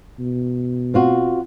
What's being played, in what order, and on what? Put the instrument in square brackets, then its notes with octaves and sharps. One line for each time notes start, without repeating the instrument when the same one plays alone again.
[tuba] B2
[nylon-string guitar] C4 F4 F#4